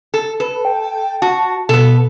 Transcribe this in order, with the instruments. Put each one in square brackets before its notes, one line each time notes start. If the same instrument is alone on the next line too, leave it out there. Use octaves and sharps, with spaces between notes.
[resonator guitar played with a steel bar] A4
[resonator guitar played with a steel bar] A4 [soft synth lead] B4
[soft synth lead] G5
[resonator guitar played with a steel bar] F#4 [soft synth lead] A5
[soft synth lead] B2 [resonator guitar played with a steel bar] B3 A4